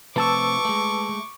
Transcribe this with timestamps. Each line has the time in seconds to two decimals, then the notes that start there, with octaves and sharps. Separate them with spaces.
0.16 C3 F3 A3 B4 A5 C#6 D6 E6
0.65 G#3 A3